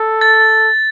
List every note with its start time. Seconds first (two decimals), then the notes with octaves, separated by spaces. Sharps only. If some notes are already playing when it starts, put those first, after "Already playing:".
Already playing: A4
0.21 A6